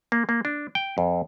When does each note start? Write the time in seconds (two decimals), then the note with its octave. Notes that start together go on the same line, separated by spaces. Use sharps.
0.12 A#3
0.29 A#3
0.45 D4
0.75 G5
0.98 F2